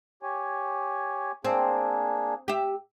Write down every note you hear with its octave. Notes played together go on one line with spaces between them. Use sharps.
G4 C#5 G#5
A#3 C4 D4 G#4
G4 E5